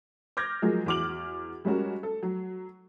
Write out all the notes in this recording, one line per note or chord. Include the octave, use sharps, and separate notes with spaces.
D6 F6 G6 G#6 A#6
F3 F#3 G#3 G#4 A#4
E2 F#4 D6 F6 F#7
G3 G#3 C#4 F#4 A#4
A4
F#3